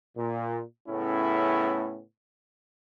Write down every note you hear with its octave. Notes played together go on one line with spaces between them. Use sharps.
A#2
A2 C#3 A3 B3 C#4 E4